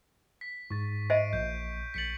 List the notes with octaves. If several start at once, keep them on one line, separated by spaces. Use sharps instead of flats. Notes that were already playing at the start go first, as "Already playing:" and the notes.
B6
G#2 C#6 A6
C5 D#5 E5 C7 D7 D#7
A#1 G6
A#1 A6 B6 C#7 F#7